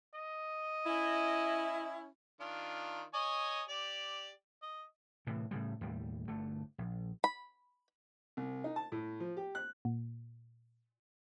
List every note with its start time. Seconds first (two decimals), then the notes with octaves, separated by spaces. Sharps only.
0.15 D#5
0.86 C#4 E4
2.40 D#3 D4 F4
3.14 C#5 D#5 G#5
3.69 G4 D5
4.62 D#5
5.27 A2 C3 E3
5.51 A2 C#3 G3
5.81 D#2 A2 G3
6.28 G1 D3 A3
6.78 A#1
7.24 B5
8.37 C2
8.64 D#4
8.76 A5
8.92 A2
9.20 F3
9.37 G4
9.55 F#6
9.85 A#2